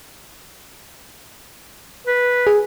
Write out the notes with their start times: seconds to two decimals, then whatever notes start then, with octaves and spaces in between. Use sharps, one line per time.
2.07 B4
2.47 G#4